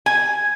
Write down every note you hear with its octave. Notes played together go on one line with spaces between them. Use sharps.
G#5